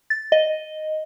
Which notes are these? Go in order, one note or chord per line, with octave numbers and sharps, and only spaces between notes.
A6
D#5